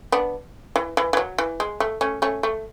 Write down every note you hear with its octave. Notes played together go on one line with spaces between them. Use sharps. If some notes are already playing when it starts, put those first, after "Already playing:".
B3 D4
E3
E3
E3
F#3
E3
G#3
A3
A3 C#4
A3 C#4
A3